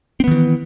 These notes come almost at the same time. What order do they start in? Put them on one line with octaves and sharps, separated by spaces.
C4 B3 D#3 E3